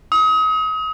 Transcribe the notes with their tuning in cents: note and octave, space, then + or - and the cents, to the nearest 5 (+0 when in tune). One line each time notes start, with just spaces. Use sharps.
D#6 +35